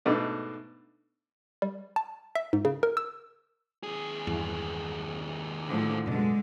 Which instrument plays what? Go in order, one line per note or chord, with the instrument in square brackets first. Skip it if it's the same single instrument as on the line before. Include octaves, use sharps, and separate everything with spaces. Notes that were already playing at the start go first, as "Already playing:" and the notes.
[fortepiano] G#2 B2 A3 D4
[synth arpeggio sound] G3
A5
E5
G#2
C#3
A#4
E6
[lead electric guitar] D#2 G#4
[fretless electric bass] E2 G2 E3
[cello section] A2 D3 F3
[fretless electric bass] F#2 B2 [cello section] D3 G#3